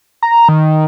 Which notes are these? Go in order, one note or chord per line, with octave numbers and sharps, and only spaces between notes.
A#5
D#3